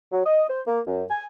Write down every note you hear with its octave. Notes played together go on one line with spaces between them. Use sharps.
F#3
D#5
C5
A#3
F#2
G#5